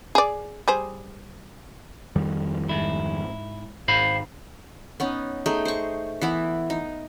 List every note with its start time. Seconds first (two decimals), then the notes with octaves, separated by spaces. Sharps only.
0.15 G#4 D5
0.68 G3 G#4 C5
2.16 F2 D#3 G3
2.69 G#2 E4
3.88 G#1 C5 F5 B5
5.00 B3 C#4 D#4
5.46 A3 D#4 G#4 G5
5.65 C5 C#6
6.21 E3 B3 E4
6.70 D#4